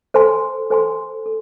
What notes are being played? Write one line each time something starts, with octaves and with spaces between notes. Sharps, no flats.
A4 C5 G#5 C6
A4 C5 G#5 C6
A4